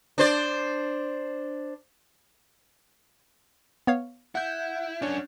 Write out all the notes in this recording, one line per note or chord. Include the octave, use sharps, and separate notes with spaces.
D4 C5 D5
B3 C#5 F5
E4 F#5 G6
F#2 C#4 D4 C#5